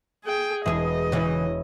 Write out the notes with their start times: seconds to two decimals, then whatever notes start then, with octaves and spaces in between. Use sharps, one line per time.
0.25 G#4 G5
0.66 E1 E4 G#4 D#5 D#6 C7
1.12 C#3 E3 E4 C#5